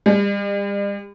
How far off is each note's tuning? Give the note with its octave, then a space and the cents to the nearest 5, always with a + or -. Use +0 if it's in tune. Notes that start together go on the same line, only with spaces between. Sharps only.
G3 +40